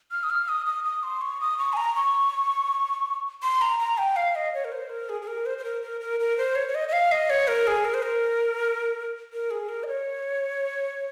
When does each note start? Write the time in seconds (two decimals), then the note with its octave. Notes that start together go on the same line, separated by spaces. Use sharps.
0.11 F6
0.23 D#6
0.30 F6
0.49 D#6
0.66 D#6
0.84 D#6
1.03 C6
1.21 C#6
1.41 D#6
1.59 C#6
1.73 G#5
1.77 A#5
1.95 C#6
3.43 C6
3.61 A#5
3.79 A#5
3.98 G5
4.16 F5
4.35 D#5
4.54 C#5
4.65 A#4
4.72 C5
4.90 A#4
5.09 G#4
5.22 G#4
5.27 A#4
5.46 C5
5.58 C5
5.64 A#4
5.82 A#4
6.01 A#4
6.20 A#4
6.38 C5
6.55 C#5
6.68 C#5
6.75 D#5
6.89 D#5
6.93 F5
7.12 D#5
7.30 C#5
7.48 A#4
7.67 G#4
7.85 A#4
7.94 C5
8.02 A#4
9.33 A#4
9.51 G#4
9.69 A#4
9.83 D#5
9.88 C#5